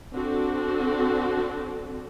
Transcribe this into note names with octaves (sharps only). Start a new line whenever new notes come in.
C4 D4 F#4 A4